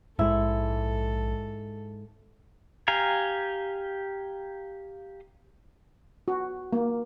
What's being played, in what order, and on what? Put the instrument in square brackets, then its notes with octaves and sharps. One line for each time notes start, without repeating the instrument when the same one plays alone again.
[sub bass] A#1 [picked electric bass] G#2 G#3 [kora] E4 [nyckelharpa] A4
[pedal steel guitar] G4 F5 G#5 A#5
[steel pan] F#4
A#3